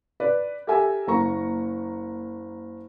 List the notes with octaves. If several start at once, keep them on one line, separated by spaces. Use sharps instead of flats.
B4 D5
G4 A4 A#4 E5 G#5
F#1 A#3 A#5 C#6